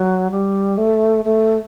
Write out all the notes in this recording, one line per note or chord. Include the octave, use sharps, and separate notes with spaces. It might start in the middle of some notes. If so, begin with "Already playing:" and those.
Already playing: F#3
G3
A3
A3